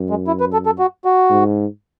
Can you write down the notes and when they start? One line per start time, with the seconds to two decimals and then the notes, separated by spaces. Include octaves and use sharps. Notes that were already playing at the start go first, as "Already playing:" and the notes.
Already playing: F#2
0.10 G#3
0.27 E4
0.40 B4
0.53 A4
0.66 A4
0.79 F#4
1.05 F#4
1.30 G#2